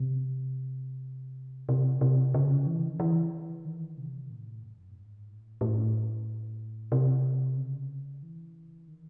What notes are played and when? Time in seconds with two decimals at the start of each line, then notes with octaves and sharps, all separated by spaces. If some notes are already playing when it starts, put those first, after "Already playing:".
Already playing: C3
1.69 C3
2.01 C3
2.34 C#3
2.67 E3
2.90 D#3
3.00 E3
3.65 D#3
3.97 C3
4.30 A2
4.63 F#2
4.91 A2
4.96 G#2
5.28 A2
5.61 A2
6.92 C3
7.57 C#3
8.23 E3
8.88 D#3